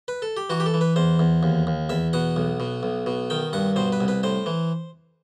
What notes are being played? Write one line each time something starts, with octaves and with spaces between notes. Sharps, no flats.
B4
A4
G4
E3 F#4
G4
A4
E3
B4
E2 C5
E2
D#2
D#2
E2 E5
B2 F#5
B1
B2
B1
B2
D#3 G5
G2 F#5
B2 C5
B4
C2
B4
A2 C5
E3